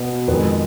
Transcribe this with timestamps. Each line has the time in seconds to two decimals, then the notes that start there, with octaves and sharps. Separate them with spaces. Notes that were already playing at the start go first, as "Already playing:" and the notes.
Already playing: B2 B3
0.27 F2 D#3 G#3 B4